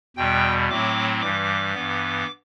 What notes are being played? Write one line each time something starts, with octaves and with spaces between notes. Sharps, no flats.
E2 B2 G3 G5
A2 F#3 A3 C4 D6
G2 E3 G3 D6
G2 E3 B3